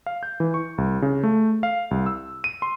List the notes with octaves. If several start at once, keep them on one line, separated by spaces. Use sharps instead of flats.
F5
G6
E3
C#6
C2
C#3
A3
F5
C2
E6
D#7
C6